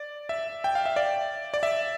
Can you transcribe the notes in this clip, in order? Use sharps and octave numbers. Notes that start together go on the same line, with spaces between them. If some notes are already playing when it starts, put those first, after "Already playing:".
Already playing: D5
E5
G5
F5
E5
D5
D5
E5